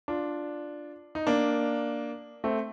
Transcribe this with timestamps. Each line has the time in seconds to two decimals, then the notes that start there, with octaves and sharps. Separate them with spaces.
0.08 D4 F4
1.15 D#4
1.27 A#3 D4
2.44 A3 C4